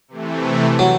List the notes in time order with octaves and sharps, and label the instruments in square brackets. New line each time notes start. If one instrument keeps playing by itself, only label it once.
[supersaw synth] C3 E3 A3
[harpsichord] F#3